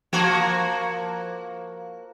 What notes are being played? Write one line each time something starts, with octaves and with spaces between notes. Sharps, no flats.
F3 A#3 F#4